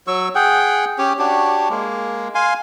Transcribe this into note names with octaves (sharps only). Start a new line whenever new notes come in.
F#3 C#6 E6
G#4 F#5 G5
C#4 G4 C#5
D4 F#4 G4 C#5
G#3 A#3
F5 G#5 C6